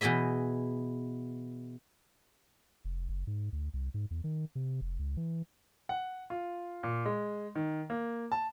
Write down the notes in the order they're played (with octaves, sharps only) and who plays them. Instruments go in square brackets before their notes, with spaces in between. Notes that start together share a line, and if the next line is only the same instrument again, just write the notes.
[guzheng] B2 E3 G#4 D#5 E5
[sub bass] F1
F#1
G#2
D2
C2
G#2
E2
D#3
C3
F1
C#2
E3
[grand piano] F#5
F4
A#2
G#3
D#3
A#3
A5